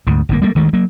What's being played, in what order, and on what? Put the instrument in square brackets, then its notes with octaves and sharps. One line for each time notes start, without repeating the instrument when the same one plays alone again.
[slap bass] D2 G#2
G1 G#2 A#3
G3 A3 A#3
D2 D#3 G#3 A3
F#3 A#3